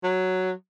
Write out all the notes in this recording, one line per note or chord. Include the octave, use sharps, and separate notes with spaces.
F#3